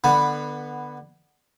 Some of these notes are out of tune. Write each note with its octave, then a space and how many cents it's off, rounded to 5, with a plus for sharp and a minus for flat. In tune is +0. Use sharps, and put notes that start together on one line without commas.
D3 +20 B3 -5 B5 +0